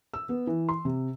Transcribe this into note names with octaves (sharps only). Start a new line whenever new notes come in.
E6
B3
E3
C6
C3